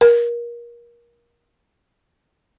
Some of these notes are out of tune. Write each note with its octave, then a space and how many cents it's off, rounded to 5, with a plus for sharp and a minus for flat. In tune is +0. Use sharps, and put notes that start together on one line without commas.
A#4 +25